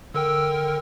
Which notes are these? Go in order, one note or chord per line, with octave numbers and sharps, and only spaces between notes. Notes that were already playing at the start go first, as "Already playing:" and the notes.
D3 A#4 G5 E6